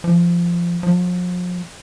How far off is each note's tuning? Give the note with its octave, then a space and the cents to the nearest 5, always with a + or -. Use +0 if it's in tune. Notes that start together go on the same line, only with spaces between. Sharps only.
F3 -15
F3 +40